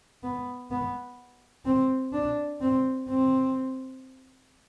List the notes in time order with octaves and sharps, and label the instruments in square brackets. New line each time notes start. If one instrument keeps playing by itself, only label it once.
[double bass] B3
B3
C4
D4
C4
C4